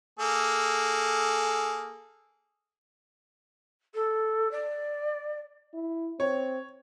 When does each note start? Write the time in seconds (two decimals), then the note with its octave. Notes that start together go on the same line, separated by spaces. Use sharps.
0.19 A#3 G#4 A4
3.94 A4
4.51 D5
5.74 E4
6.20 C4 C#5